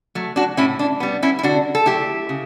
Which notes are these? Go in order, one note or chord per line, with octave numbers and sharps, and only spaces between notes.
F#3 A3
D4 F#4
A2 C#4 E4
D4
G3 B3
C#4 E4
E4
D3 D4 F#4
A4
F#3 A3 E4 G4
C#3